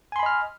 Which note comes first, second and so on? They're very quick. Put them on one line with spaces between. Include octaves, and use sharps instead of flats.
G#5 C6 B5 D#5 F6